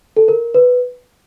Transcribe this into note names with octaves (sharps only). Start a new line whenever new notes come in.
A4
A#4
B4